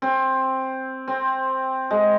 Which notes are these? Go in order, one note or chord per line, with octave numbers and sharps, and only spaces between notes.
C4
C4
G#3